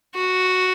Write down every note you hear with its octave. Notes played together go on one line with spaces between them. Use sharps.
F#4